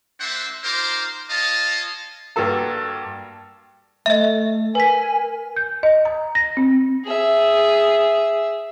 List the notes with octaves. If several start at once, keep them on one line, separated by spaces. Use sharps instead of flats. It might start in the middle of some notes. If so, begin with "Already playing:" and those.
A#3 D4 C5 E5 F#5
D#4 F4 A#4 C5 C6 D6
F4 C#5 D#5 F5 A5
G2 A#3 F#4 A4 A5
A3 D#5 E5
A#4 B4 G#5 B6
G6
D#5
A#5
A#6
C4
G#4 E5